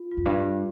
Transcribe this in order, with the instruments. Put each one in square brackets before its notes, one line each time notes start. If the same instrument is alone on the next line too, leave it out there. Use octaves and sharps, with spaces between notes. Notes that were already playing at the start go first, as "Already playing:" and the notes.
Already playing: [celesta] F4
F4
[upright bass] F2
G2
[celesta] G4